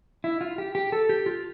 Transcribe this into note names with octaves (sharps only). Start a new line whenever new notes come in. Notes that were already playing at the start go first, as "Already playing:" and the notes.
E4
F4
G4
G4
A4
G4
F4